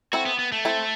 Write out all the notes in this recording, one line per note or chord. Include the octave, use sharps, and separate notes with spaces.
C4 E4 F#4 A4
B3
B3
A3
C4 E4 A4